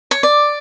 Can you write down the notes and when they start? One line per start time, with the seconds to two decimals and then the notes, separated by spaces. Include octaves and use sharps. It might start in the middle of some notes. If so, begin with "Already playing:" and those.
0.11 C#5
0.23 D5